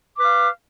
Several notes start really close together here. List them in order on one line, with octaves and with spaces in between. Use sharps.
D6 B4 F5